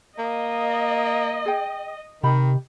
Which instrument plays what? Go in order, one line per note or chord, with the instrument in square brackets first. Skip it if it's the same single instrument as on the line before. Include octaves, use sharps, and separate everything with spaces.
[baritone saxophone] A#3 [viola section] D#5
[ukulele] G#4 G5
[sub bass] C3 [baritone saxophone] D#3 [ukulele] G4 D#5 B5